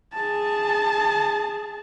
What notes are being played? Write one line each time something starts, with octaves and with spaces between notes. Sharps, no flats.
G#4 A5